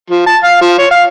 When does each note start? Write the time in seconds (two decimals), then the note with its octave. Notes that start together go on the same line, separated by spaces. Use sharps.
0.10 F3
0.26 A5
0.44 F5
0.61 F3
0.79 C#5
0.91 F5